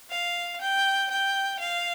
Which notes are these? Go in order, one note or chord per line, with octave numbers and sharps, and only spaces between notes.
F5
G5
G5
F5